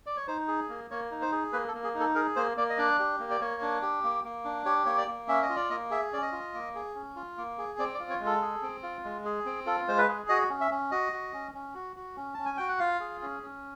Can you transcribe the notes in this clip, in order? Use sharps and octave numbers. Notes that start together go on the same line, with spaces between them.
D5
C#5
D#4 C5
G#4
A#3
A#3 C#5
D#4
C5
G#4
A#3 B4
A4
A#3
G#4
D#4
A4
G#4 A#4
A#3 C5
A#3 D5
D#5
D4 D5
G4
A#3
D5
A#3 C#5
D4
G4
A#3
A#3
D4
G4 C#5
A#3 C#5
D5
A#3
C#4 E5
D#5
F4
D5
A#3 D#5
G#4 E5
C#4 D5
D#5
F4
A#3
G#4
C#4
F4
A#3
G#4
C4 D5
D5
F4
C#5
G#3
A4
G#4
C4
F4
G#3
G#4
C4
F4 A4
G#3 C5
B4
G#4
F#4 D#5
C#4
E5
C#4
F#4 D#5
F#4
C#4
C#4
F#4
F#4
C#4
C#4 A5
G#5
F#4 G5
F#5
F4 F5
G#4
C#4
C#4